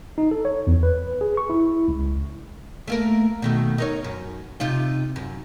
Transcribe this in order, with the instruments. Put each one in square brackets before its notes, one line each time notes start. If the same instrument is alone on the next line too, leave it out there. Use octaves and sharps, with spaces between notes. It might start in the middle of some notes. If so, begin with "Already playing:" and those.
[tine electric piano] D#4
A4
C#5
E2
B4
G#4
C#6
E4
C#2
[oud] A3 A#3 A#4
B2 D#3 A3
D#4 A#4 C#5
F#2
C3 D#4 F4
F#2